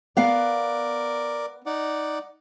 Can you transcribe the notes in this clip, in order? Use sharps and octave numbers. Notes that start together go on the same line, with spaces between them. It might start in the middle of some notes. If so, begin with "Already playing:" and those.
B3 A#4 D5 F5 F#5
D#4 D5 F#5